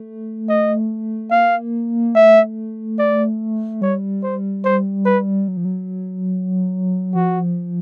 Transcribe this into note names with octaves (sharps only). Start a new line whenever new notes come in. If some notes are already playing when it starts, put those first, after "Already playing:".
Already playing: A3
D#5
A#3 F5
A3 E5
D5
G3 C#5
C5
C5
B4
F#3
F3
F#3
F3 F#4